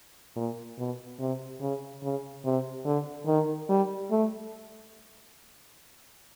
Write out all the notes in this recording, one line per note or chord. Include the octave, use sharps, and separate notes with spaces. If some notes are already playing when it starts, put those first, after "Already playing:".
A#2
B2
C3
C#3
C#3
C3
D3
D#3
G3
A3